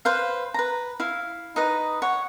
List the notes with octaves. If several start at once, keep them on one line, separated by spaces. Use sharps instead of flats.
B4 C5 F5
B4 A#5
E4 F5
D#4 B4 D#5
C#5 F#5